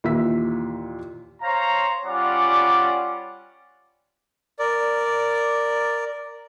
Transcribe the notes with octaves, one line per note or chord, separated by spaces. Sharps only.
D#2 A#2 E3 E5 E6 B6
C5 C#5 F5 A#5
G3 C#4 F4 D5 F#5 D6
A#4 D5